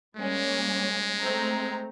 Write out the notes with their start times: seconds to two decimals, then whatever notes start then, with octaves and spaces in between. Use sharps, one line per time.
0.17 G3 G#3 A#3 C#4
1.20 A3 C4 A#5